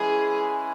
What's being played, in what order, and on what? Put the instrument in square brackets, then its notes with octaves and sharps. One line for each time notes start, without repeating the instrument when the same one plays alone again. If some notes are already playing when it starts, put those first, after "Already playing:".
Already playing: [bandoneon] E3 G#3 C#4 E4 [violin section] G#4